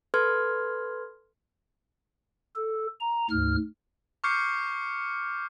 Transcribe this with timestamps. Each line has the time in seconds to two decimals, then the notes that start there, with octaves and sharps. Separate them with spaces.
0.14 A4 B4 C6 F6 G#6
2.56 A4
3.00 A#5
3.30 D2 G#2 F6
4.24 C#6 D6 F6 G6 C7 C#7